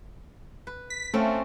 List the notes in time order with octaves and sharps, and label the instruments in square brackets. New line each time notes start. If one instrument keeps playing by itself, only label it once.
[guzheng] B4
[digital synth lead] B6
[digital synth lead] A3 [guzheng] C4 C#4 F4